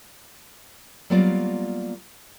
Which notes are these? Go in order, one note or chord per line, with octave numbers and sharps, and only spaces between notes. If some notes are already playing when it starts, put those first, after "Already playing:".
F#3 G3 A#3 B3 F4 D5